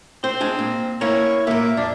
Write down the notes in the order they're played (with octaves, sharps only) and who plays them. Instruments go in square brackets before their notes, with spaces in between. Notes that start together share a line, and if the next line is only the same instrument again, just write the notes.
[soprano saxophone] C4 [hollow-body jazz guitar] C5
[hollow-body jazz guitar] G#3 D4 G#4
A#2
[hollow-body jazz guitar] A#3 C#4 E4 [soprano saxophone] C#5
[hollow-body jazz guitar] A#2 A#3 [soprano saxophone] E5
[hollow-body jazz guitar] F2 [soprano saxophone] D4